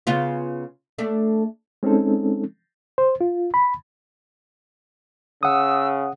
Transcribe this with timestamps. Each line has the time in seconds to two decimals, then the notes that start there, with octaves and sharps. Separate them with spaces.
0.07 C#3 B3 F4
0.98 A3 D4
1.83 G#3 C4 C#4 D#4 A4
2.98 C5
3.21 F4
3.54 B5
5.43 C#3 F#5 D#6 E6